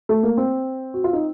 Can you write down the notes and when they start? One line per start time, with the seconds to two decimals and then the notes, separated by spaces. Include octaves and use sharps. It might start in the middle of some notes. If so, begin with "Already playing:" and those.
0.09 A3
0.23 A#3
0.37 C4
0.94 F#4
1.04 F4
1.13 D#4